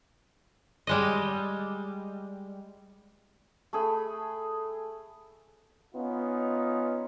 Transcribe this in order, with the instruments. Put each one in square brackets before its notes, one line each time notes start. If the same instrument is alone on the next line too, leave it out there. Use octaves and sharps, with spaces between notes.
[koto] G3 G#3 D#5
[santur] A3 G#4 B5
[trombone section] B3 C#4 D#4 F4